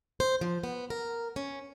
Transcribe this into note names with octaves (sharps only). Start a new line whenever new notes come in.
C5
F3
B3
A#4
C#4